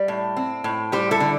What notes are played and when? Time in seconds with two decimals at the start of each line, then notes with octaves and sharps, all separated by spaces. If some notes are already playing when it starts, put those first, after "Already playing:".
Already playing: G3
0.08 A2
0.37 C4
0.64 A2
0.92 G3 G4 C5
1.11 E4 A4
1.20 D3